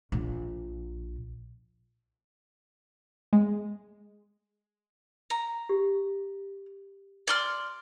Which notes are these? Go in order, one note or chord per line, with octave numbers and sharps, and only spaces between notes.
A#1
G#3
A#5
G4
D5 C6 F6